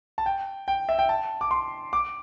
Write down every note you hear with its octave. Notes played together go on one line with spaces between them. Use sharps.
A5
G5
G5
E5
G5
A5
D6
C6
D6